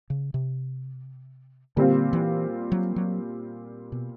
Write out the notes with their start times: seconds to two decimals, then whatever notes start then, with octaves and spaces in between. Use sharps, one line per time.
0.10 C#3
0.34 C3
1.76 A#2 D3 G3 C4 F4
2.13 E3
2.72 F#3
2.96 F#3
3.92 B2